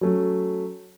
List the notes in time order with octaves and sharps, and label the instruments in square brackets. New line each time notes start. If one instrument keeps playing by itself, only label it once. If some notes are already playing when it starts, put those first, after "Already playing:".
[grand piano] F#3 A3 C#4